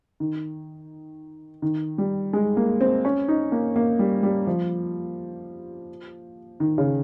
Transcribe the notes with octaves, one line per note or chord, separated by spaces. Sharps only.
D#3
D#3
G3
G#3
A#3
C4
C#4
D#4
A#3
A#3
G3
G3
F3
D#3
C#3